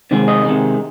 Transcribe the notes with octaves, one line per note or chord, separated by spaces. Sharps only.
C3 D#3 G#3
D#5
C3 D#3 G#3